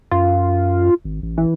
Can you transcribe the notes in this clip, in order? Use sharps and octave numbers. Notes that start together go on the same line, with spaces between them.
F#2 F4
G#1
A1
E3